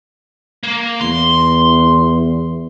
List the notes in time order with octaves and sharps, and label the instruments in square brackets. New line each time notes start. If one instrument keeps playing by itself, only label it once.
[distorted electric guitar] A#3
[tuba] E2 [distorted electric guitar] C6